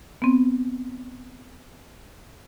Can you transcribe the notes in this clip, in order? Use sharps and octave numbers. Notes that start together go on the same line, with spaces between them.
B3 C4